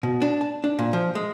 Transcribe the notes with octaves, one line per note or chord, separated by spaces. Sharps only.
B2
D4
A5
D4
A#2
F3
G#3